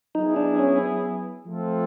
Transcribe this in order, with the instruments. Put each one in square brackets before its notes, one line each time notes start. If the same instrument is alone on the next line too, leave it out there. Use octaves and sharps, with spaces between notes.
[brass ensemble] F#3 B3 E4 G#4 [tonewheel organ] D#4
[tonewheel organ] D4
C#4
[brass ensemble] F3 A3 C4 F4 A4